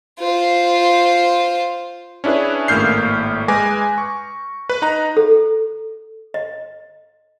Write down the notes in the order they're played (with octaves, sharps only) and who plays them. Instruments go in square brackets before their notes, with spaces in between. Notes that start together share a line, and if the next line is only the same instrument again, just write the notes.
[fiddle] F4 C5
[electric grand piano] C#4 D4 E4 G#4 B4
G#1 A2 A#3 F6 G6 C7
G#3 B4 G#5 D6 A#6
C#6
B4
D#4 A#5
[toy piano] A4
D#5